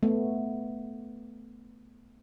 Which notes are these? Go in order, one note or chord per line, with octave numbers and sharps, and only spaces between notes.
A3 B3